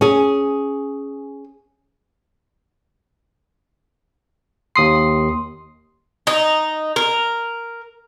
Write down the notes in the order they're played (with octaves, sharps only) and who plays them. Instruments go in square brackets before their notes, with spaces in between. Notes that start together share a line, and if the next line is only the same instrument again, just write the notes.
[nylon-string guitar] C#4 G#4
[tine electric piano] D#2 D#6 C7 [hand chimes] C6
[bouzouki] D#4
A#4